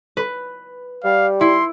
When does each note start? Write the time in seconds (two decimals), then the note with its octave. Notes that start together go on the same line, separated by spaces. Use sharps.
0.17 B4
1.04 G3 F5
1.41 E4 C6